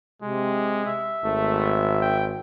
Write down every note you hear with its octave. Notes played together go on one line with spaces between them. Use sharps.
C3 G#3
E5
G#1 A3
G5